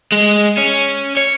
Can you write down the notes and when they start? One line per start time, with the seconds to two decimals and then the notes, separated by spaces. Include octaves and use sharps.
0.12 G#3
0.57 C#4
1.17 C#5